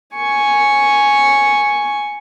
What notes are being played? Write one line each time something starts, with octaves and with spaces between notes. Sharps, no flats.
G#5 C#6